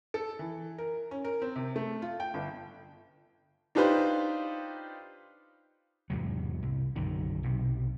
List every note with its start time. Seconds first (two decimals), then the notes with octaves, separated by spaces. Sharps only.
0.14 A4
0.39 E3
0.78 A#4
1.11 C#4
1.25 A#4
1.42 C4
1.56 C3
1.76 A3
2.02 F4
2.20 G5
2.34 G1
3.75 D4 D#4 F4 G4 B4 C5
6.10 E2 G#2 C3 F#3
6.63 C2
6.96 B1 F#2 D3 D#3
7.43 B1 C3